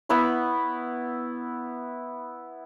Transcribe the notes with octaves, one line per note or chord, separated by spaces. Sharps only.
B3 E4 B5 C#6